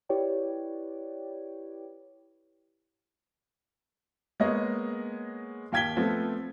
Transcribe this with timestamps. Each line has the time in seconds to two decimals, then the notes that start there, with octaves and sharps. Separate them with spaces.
0.09 E4 G4 B4 C#5 D5 G5
4.40 G#3 A#3 B3 G#4 C#5 D#5
5.72 D#2 F5 G5 G#6 B6 G7
5.96 F3 A3 B3 C4 F4